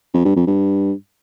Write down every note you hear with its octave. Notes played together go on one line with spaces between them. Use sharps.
F2
G2
F2
G2